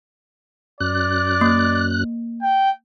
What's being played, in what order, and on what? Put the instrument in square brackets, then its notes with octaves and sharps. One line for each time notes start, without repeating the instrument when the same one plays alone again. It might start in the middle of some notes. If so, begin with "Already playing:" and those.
[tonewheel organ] F#2 F#6 [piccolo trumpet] D5
[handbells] A#3
[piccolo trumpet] G5